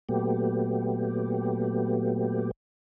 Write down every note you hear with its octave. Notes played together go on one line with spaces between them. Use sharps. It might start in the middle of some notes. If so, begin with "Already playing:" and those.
A#2 F#3 A3 B3 G4